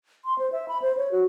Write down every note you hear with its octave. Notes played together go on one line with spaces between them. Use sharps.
C6
C5
E5
B5
C5
C#5
F#4